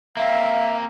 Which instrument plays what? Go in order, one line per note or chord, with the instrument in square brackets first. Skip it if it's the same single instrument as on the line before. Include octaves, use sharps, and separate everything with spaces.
[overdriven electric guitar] A#3 C4 [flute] E5 [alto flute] F5